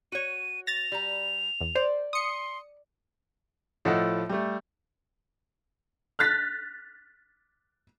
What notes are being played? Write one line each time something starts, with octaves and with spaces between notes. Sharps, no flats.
F#4 C#5 D#7
A6 A#6 F7
G3 A#5
E2
C5 D5
C6 D#6 C#7
A2 F3 A4 D#5 F#5
G3 A3
F6 F#6 A6 B6